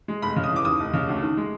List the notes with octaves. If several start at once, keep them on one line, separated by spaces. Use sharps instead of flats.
G#3
F1 B5
C#3
D#6
E3 D6
D#2 D#6
F1
C#3
D2
D#3
G#3